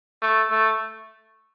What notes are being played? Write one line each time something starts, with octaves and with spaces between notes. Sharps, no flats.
A3
A3